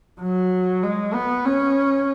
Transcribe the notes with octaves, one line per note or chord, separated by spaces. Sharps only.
F#3
G#3
B3
C#4